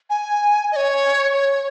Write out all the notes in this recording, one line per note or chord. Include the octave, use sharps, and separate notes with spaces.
G#5
D#5
C#5
C#5